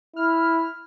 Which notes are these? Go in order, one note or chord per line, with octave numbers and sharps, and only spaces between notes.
E4 F6